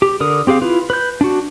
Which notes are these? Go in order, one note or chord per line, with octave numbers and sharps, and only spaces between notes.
G4
D3 A#4 D#6
C4 G4 G#4 F5
E4 F4 B4
B4 G6
D4 F#4